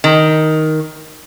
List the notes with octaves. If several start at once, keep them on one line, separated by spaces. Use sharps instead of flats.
D#3